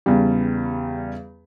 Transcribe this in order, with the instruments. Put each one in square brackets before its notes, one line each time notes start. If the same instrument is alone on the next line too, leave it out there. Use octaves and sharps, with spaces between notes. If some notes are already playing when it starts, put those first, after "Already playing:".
[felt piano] E2 C#3 G3